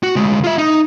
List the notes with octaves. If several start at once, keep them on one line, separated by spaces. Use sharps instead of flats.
F#4
D2 G#3
F4 E5
D#4